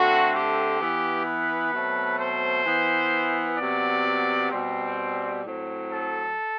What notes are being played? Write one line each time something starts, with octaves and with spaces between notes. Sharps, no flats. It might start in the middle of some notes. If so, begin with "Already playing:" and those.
Already playing: D3 A3 C4 F#4
G4
E3 B3
B4
B2 F#3 A3 C4
C5
E3 B3
C3 F#3 B3 D5
B2 G3 C4
A2 F#3 C4
A4